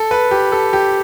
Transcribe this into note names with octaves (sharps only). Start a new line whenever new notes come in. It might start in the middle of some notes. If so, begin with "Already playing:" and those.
Already playing: A4
B4
G4
A4
G4